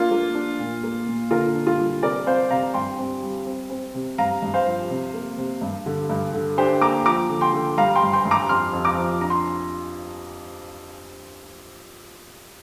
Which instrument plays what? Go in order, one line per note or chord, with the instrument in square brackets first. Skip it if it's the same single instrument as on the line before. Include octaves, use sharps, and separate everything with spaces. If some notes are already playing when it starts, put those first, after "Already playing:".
Already playing: [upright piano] A#3 D4 F4
A#3
D4
A#2
A#3
A#2
D3 F4 A#4
D4
F4
G3
C3 A#4 D5
C4 C5 F5
C3 F5 A#5
G2 G5 C6
C4
G3
C4
C4
C3
G2 F5 A#5
G2
C5 F5
F3
C3
A#3
C3
G2
D3
G2
D3
D4 G4 C5
A#3 A#5 D6
F3 A#5 D6
D3
G5 C6
D3
G3 F5 A#5
G5 C6
G2
G5 C6
G2
A#5 D6
F2 C6 F6
F2
A#5 D6
F3
D4 A#5
C6